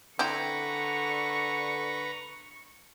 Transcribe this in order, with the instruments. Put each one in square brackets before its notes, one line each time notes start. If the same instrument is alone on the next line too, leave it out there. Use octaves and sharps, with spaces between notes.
[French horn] D3 [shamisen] C4 E4 [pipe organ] B4 A#5 [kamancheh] C#6